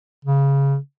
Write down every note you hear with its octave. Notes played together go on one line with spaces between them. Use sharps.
C#3